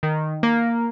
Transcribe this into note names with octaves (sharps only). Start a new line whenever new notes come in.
D#3
A#3